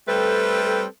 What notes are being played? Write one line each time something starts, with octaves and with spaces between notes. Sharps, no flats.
G3 A3 C4 A4 B4